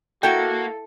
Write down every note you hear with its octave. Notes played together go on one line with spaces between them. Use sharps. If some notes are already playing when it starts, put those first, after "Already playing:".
A#3 E4 F#4 A4 E5 G5